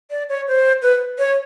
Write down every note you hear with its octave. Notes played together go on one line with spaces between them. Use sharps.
D5
C#5
C5
B4
C#5